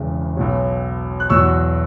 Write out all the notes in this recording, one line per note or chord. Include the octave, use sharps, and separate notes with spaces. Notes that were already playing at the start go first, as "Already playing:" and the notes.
Already playing: E1 E2 C#3
B1 B2 F#3
F#6
E2 B2 F#3 C#6 E6